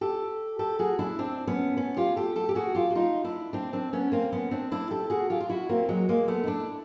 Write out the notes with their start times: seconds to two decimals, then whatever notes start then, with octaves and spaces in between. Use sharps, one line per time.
0.01 G4 A4
0.59 G4 A4
0.79 F#4 G#4
0.99 D4 E4
1.19 C4 D4
1.47 B3 C#4
1.77 B3 C#4
1.97 F4 G4
2.16 G4 A4
2.36 G4 A4
2.49 G4
2.55 F#4 G#4
2.75 F4 G4
2.90 F#4
2.95 D#4 F4
3.24 D4 E4
3.53 C4 D4
3.73 C4 D4
3.93 B3 C#4
4.12 A#3 C4
4.32 B3 C#4
4.51 C4 D4
4.71 D4 E4
4.91 G4 A4
5.10 F#4 G#4
5.30 F4 G4
5.40 F4
5.49 E4 F#4
5.69 A#3 C4
5.89 F#3 G#3
6.09 G#3 A#3
6.28 A3 B3
6.44 D#4
6.47 D4 E4